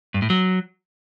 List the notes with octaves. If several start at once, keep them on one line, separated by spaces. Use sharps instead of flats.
G2
A2
F#3